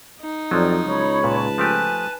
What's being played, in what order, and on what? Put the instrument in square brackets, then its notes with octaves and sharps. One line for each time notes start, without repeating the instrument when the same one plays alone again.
[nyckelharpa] D#4
[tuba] F2 [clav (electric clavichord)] F3 F#3 [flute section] G4 D5
[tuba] C#2 [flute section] C#5 B5 C#6
[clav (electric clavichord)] A#2 [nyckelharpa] B4 A5
[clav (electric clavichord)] F3 A3 G4 [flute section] G#5 F#6